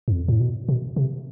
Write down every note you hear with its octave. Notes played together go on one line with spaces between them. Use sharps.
G2
F2
A2
B2
B2
C3